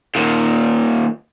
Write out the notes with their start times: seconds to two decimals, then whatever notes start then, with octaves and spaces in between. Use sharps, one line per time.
0.15 D#2 A#2